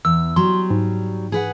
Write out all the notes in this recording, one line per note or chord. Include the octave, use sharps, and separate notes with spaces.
E2 E6
F#3 G3 C6
G#2
G#4 B4 F#5